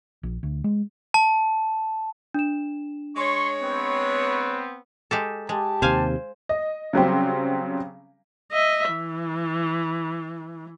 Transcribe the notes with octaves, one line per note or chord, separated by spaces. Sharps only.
A#1
D2
G#3
A5
D4 E7
G#3 C#5 C6 C#6
B3 C4
G#3 G4 A4
G#3 G4 A5
D#2 C3 C5 F5 G#5
D#5
C#3 F#3 G3 C4
D#5 E5
E3